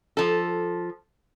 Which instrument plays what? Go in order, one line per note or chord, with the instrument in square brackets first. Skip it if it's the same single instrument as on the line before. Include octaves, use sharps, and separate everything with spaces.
[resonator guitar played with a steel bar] F3 A4